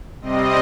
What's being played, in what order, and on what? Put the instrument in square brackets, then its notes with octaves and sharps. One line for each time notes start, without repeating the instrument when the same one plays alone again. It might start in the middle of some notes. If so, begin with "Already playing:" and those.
[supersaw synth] C3 G3 C4 D#5